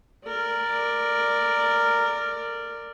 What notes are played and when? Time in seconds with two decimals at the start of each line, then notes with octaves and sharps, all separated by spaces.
0.27 A#4 D5